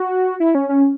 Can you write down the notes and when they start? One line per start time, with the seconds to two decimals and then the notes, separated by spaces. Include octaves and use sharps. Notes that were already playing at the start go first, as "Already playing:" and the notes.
Already playing: F#4
0.40 E4
0.55 C#4
0.69 C#4